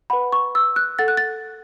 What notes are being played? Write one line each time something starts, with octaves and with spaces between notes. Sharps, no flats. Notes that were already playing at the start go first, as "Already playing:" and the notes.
B4 F#5 B5
C#6
E6
F#6
A4 F#5 A6
F#6
A6